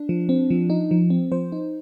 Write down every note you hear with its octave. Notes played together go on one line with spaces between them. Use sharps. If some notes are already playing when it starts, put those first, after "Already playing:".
Already playing: D4
F3
C4
F3
D#4
F3
C4
F3 C5
D#4